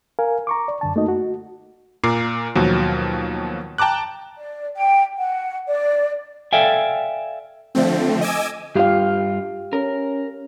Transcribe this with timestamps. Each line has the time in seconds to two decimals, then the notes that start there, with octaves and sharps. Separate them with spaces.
0.19 A#4 F5 G#5
0.47 A#5 C#6 D6
0.68 D5
0.81 F#2 D3 A5
0.96 A3 A#3 D#4 F#4 D#5
1.08 F#4
2.04 A#2 A#4 D6 C7
2.55 D#2 B2 F3 F#3
3.78 G5 A5 A#5 D6 F#6
4.37 D5
4.76 G5
5.18 F#5
5.68 D5
6.53 A4 D5 E5 F5 G5 G#5
7.75 D3 F3 A3 C4
8.21 D#5 G#5 D6 E6 G#6
8.76 G2 F4 G4 F5
9.73 C#4 A#4